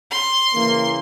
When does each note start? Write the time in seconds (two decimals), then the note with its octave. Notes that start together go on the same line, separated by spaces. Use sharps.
0.11 C6
0.54 C#3 E3 A#3